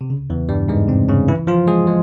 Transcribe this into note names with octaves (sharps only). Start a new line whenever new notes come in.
C3
C#3
E2 E3
G2 G3
G#2 G#3
C3 C4
C#3 C#4
E3 E4
F3 F4
G#3 G#4
G#3